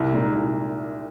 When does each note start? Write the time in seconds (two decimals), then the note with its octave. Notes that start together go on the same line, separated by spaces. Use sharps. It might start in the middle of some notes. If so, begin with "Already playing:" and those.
Already playing: C2
0.13 A#2 G#3 D#4
0.35 C2